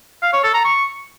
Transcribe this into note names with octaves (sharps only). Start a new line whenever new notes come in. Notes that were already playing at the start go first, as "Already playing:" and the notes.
F5
C#5
A4
A#5
C#6